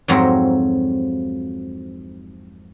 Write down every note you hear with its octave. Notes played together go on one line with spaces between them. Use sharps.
F2 G#2 F#3 C4 A#5